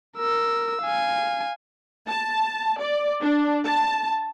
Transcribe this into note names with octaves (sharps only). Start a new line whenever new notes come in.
A#4 E6
F5 G#5
A5
D5
D4
A5